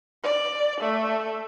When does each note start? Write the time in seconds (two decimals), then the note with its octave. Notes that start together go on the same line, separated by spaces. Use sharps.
0.23 D5
0.80 A3